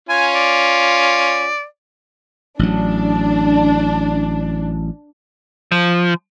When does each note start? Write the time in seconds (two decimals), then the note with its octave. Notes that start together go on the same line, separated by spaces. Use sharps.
0.09 C#4 F4 G#5
0.35 D5
2.59 A1 F#3 D4
5.72 F3